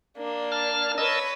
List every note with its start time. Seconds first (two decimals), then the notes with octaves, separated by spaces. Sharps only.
0.18 A#3 D4
0.52 A5 F6
0.98 B4 C#5 D#5 A5 E6